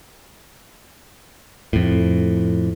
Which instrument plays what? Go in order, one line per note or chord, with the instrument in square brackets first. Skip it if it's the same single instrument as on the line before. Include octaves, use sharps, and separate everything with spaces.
[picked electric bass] F2 A2